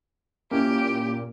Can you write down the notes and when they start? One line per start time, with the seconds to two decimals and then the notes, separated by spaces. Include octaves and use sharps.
0.51 A#2 A#3 C#4 E4 G4